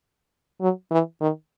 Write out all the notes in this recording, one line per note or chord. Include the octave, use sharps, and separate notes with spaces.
F#3
E3
D#3